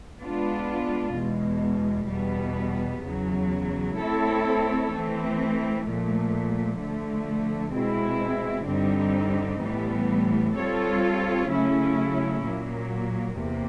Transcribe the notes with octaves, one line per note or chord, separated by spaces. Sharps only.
G#3 B3 D4 F4
E2 B2 G#3
E2 B2 G3 B3
E2 C#3 F#3
A3 C4 E4 A4 C#5
E3 A3 C4
A#2 F3 A3
D3 F3 A3
B2 G#3 C4 E4
G2 D3 G3 C4 D#4
A2 E3 G3 B3
G3 C4 F4 A4 C#5
C#3 F#3 A3 C#4 E4
A#2 F#3 A#3
E2 C3 A#3